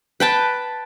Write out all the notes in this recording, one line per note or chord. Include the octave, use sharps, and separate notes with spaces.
B4 G5 A5